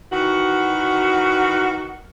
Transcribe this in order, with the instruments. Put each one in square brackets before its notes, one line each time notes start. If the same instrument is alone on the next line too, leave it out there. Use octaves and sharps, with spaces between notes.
[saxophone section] D#3 E3 F#4